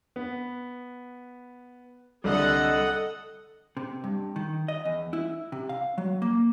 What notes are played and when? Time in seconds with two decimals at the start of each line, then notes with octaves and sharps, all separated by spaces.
0.16 B3
2.24 C2 D3 A4 D#5 F#5
3.77 C3
4.04 G2
4.36 D#3
4.68 D#5
4.85 E2
5.13 E4
5.52 C3
5.69 F5
5.98 F#3
6.22 A#3